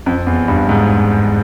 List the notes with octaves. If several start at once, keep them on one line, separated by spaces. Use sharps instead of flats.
F2
E2
G2
G#2